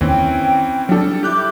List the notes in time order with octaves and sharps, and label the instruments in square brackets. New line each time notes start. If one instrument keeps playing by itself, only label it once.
[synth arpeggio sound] D#2 [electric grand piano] E3 C4 C#4 [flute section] G5
[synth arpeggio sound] F#3 D4 [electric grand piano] G3 A4
[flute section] E4 D6 [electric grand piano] G4 F#6 G6